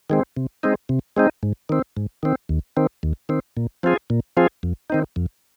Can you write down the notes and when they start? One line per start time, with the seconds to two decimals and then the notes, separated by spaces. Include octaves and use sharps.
0.10 D#3 G#3 C4
0.37 C3
0.63 G#3 C4 D#4
0.89 C3
1.17 G#3 C4 D#4
1.43 G#2
1.69 D#3 C4
1.97 G#2
2.23 D#3 C4
2.49 D#2
2.77 D#3 C4
3.03 D#2
3.29 D#3 C4
3.57 A#2
3.83 F3 C4 F4 G#4
4.10 A#2
4.37 F3 C4 F4 G#4
4.63 F2
4.90 D#3 C4 D#4
5.16 F2